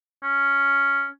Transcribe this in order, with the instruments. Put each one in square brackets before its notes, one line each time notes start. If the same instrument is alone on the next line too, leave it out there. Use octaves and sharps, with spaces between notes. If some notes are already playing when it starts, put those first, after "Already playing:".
[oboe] C#4